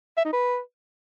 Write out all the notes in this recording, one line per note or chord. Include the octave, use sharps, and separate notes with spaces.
E5
D#4
B4